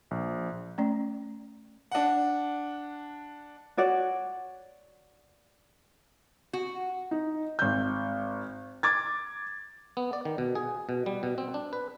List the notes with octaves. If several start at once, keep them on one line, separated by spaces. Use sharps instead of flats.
A#1
A3 C#4 D5
D4 F#5
F#4 C#5 D5 F#5
F#4
D#4
G#1 G6
D6 G#6 A6
B3
D5
D#3
B2
G#4
B2
G3
B2
C4
D4
B4